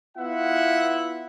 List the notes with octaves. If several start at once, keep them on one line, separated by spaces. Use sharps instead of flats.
B3 E4 F4 E5 F#5